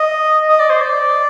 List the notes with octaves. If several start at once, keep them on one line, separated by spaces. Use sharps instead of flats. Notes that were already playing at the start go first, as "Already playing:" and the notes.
Already playing: D#5
D#5
D5
C5
D5